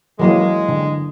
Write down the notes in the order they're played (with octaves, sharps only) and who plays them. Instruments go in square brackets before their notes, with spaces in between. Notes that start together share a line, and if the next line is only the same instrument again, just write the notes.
[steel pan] E3 F#3 A#3 [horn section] G#3
[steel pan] D3